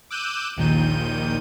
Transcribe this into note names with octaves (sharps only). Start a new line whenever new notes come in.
D6 E6 F#6 G6 D#7 E7
A#1 D#2 A#2 D#3 G6 D#7